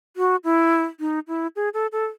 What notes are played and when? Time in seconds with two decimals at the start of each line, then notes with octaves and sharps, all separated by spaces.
0.17 F#4
0.44 E4
1.00 D#4
1.28 E4
1.56 G#4
1.74 A4
1.92 A4